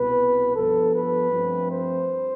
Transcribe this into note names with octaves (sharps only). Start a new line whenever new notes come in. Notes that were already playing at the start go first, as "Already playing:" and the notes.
Already playing: C2 B2 B3 B4
G2 F3 B3 A4
B4
G2 F3 A3 C4
C5